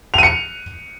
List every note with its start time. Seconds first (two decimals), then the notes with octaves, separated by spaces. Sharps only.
0.14 F7
0.18 D#7
0.23 C#7